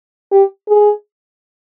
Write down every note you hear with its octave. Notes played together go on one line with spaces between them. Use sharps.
G4
G#4